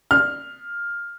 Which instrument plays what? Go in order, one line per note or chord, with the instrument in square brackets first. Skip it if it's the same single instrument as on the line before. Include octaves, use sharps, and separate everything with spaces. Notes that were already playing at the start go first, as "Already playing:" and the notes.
[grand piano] F6